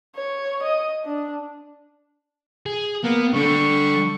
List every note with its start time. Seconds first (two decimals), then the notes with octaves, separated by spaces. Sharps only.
0.15 C#5
0.63 D#5
1.05 D4
2.66 G#4
3.04 A#3 B3
3.34 D3 G3 C#6